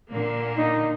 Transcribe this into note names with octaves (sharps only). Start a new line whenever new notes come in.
A#2 D3 A#3
D#4